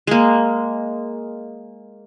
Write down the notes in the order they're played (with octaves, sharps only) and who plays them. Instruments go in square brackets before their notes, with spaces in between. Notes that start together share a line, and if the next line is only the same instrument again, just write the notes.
[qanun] G#3 A#3